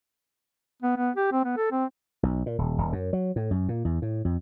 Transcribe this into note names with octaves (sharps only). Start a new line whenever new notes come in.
B3
B3
G4
C4
B3
A4
C4
B1
A#2
D#1
D#1
F#2
F#3
A2
F#2
A#2
E2
A2
F2